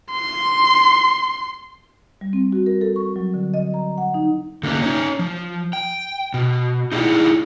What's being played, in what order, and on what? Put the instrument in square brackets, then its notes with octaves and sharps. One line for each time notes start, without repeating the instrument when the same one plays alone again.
[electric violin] C6
[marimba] G3
C4
F#4
A#4
A4
C#6
F#3
D3
D#5
A#5
F#5
D#4
[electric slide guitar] D3 A#3 C#4 B4
C#4 D#4 C#5
F3
G5
B2
D#4 E4 G#4 D5 F#5 G5